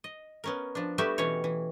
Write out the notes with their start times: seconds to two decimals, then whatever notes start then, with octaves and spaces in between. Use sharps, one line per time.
0.04 D#5
0.44 B3 C#4 A#4
0.75 F3 D4
0.98 G3 A3 B3 F#4 G4 E5
1.18 B2 E3 C#4 C#5
1.44 E3